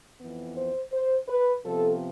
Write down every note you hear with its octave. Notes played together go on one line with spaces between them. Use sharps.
F2 E3 B3
C5
C5
B4
C3 F3 B3 A4